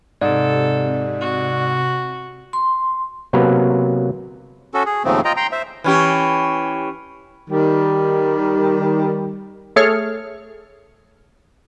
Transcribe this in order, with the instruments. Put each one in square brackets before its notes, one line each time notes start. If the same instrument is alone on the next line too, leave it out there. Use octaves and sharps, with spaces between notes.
[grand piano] G#2 [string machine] C3 [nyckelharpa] A4 [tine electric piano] D5
[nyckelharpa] F#4
[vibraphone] C6
[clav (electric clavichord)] C3 F#3 A#3 B3 B4 A#5
[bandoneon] C#4 F#4 A4
G#4
D#2 G#2 C#3 F3 A3 C4
F4 D#5 G5 A#5
G5 A#5 C6
C5 E5
[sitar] E3 C#4 G4
[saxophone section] D#3 G3
[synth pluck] A3 G#4 A4 C#5 F6